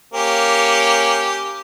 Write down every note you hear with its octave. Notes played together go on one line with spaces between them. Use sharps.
A#3 C#4 G4